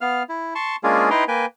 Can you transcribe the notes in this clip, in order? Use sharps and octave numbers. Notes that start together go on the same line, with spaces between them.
B3 F5 F6
E4
A5 C6 C#6
G#3 A#3 C#4 D4 F4 G#4
D#4 E4 B4 G5 A#5 C6
A#3 B4 G5 G#5